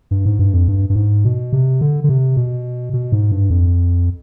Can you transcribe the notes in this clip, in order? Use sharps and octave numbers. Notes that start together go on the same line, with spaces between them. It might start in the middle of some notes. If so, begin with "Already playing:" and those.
G2
G#2
G2
F2
G2
G2
G#2
B2
C3
D3
D3
C3
B2
B2
G#2
G2
F2